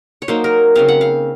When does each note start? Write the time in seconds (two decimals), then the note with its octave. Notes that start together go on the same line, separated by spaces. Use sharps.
0.22 C#5
0.28 F#3 A#3 D#4 C5
0.44 A#4
0.75 C#3 F#3 C4 F5
0.89 F#5
1.01 F5